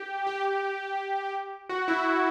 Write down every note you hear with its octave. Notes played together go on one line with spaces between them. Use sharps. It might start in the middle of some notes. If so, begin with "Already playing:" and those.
Already playing: G4
G4
F#4
E4